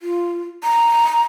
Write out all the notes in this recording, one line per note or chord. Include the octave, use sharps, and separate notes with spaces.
F4
A#5